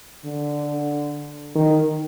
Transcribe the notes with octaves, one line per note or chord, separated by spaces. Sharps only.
D3
D#3